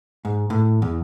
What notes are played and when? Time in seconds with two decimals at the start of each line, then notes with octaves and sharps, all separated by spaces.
0.25 G#2
0.50 A2
0.82 E2